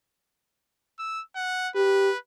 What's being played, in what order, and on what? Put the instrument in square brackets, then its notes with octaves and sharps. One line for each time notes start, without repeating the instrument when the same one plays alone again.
[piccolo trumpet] E6
F#5
[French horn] G4 [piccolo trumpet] B4